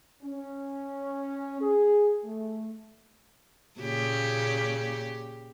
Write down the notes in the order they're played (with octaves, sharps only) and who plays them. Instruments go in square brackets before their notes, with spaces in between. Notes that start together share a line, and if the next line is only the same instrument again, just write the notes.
[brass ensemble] C#4
G#4
A3
[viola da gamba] A#2 C#3 G4